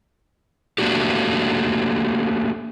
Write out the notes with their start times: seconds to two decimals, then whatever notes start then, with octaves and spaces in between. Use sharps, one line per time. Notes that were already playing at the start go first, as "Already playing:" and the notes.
0.78 A3 A#3 D4 F#4 G4